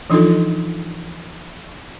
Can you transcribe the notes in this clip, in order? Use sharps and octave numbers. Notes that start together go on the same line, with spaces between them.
E3 F3 D4 D#4 F4 A4